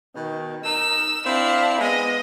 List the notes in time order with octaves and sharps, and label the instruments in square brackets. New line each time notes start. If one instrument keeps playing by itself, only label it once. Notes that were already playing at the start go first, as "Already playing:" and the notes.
[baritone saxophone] B2 [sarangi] D#3
[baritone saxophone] D#4 [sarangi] A#4 [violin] E6
[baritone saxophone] C4 [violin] D4 E4 [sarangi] F5
[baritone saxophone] G#3 [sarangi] B3 [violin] D#5